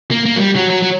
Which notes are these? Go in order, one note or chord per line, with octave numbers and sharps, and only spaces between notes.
A#3
A#3
F#3
G3
F#3
F#3
F#3